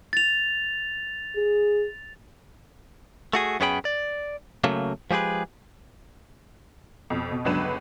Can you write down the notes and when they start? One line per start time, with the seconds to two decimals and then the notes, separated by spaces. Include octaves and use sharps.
0.13 A6 F7
1.36 G#4
3.33 A3 F#4 G#4
3.60 F#2 B3 C#4 G#4 G5 B5
3.85 D5
4.64 C#3 F#3 A3 A#3
5.11 F3 G#3 G4 G#4 B4
7.10 F2 B2
7.31 B2
7.44 G1 C#2 F#3 D4 B4 E7